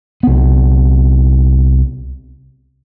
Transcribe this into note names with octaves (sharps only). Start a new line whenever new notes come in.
C2 B3